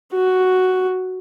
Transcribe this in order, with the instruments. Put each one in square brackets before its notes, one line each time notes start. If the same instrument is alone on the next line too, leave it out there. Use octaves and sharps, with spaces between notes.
[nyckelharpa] F#4